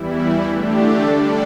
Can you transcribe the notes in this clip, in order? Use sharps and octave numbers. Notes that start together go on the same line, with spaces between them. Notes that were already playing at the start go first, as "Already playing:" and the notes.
Already playing: E2 E3 G3 E4
D3 A3 D4 G4
D3 G3 D4 A4 D5